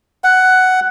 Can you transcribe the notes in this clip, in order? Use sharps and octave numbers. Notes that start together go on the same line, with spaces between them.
F#5